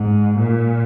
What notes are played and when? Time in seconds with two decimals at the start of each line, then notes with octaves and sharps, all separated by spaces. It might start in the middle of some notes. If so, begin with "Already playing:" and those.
Already playing: G#2
0.39 A#2